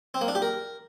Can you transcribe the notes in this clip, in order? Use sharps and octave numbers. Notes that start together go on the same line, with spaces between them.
C4
A#3
D4
G4
A#4